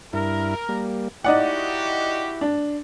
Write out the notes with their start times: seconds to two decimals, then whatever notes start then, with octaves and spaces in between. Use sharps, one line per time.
0.13 G2 E4 A#4
0.69 G3 A#3
1.24 D#4 E4 F#4 G4 D5 F#5
2.41 D4